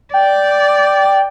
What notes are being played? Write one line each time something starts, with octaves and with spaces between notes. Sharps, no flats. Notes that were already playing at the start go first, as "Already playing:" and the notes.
D5 G5